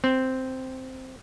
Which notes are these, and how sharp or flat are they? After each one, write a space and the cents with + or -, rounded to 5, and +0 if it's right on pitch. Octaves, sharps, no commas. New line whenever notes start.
C4 -5